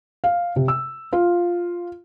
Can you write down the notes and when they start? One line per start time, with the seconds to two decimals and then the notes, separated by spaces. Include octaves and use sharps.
0.24 F5
0.56 C3
0.68 E6
1.13 F4